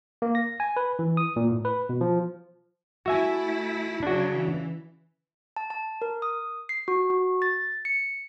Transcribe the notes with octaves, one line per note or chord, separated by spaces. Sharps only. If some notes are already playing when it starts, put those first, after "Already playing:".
A#3
A#6
G#5
B4
E3
D#6
A#2
A2
B4
B2
F3
A3 E4 F#4 E5 G#5
C#3 F#3 D4 F#4
E3
A5
A5
A#4
D#6
C7
F#4
F#4
A6
C#7